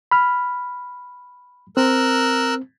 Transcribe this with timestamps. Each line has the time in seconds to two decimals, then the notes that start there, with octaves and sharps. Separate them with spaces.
0.11 B5 F6
1.77 C4 A#4 E6 F#6